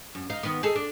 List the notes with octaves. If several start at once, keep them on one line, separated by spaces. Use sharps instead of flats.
F#2
D#4 F5
D#3 B3
D#4 G#4 A4
D4